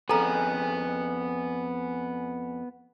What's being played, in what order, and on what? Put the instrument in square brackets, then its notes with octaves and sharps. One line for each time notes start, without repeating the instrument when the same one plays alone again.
[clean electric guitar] F2 C#4 G#4 [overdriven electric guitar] B3 [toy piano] A4 A#5